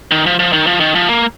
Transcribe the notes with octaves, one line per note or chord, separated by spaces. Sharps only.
D#3
F3
F3
D#3
F3
D#3
F3
A#3